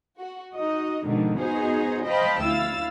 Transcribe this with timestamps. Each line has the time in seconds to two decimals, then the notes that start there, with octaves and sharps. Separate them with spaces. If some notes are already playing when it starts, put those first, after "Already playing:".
0.19 F#4
0.54 D#4 F#4 D#5
1.05 G#2 B2 D3 D#3 F3
1.40 B3 D#4 F#4 G#4 C5 G#5
2.05 C5 D#5 F5 G5 A5 B5
2.41 D2 E4 F5 E6 A6